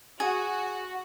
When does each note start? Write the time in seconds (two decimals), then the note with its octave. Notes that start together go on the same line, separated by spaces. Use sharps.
0.20 F#4 G#4